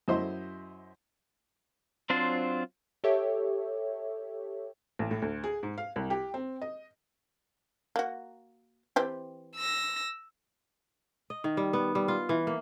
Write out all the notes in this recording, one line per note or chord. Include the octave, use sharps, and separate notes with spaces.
F#2 E4 C5 D#5 C6
F#3 C4 D4 F4 C5
G4 A4 C#5 E5
A1
A2
D2
G#4
G#2
F5
C2
G4
C4
D#5
A#3 F#4
E3 C4 G4
E6 A#6
D#5
D#3
G3
B3
G3
F4
E3
A#3